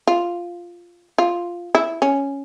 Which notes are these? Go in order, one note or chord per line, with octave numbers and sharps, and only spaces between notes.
F4
F4
E4
C#4